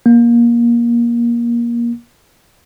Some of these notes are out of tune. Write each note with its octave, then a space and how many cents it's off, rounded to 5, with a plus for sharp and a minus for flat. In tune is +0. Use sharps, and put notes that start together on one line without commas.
A#3 +20